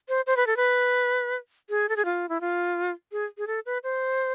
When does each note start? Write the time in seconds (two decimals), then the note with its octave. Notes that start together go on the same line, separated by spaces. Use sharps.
0.09 C5
0.27 C5
0.37 B4
0.47 A4
0.57 B4
1.70 G#4
1.89 A4
1.96 G#4
2.05 F4
2.29 E4
2.41 F4
3.12 G#4
3.38 G#4
3.47 A4
3.66 B4
3.84 C5